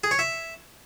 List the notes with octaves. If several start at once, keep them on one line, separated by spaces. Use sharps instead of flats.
G#4
C#5
E5